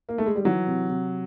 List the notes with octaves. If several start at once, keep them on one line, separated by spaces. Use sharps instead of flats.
A#3
A3
G#3
G3
E3 F#3
C3
C3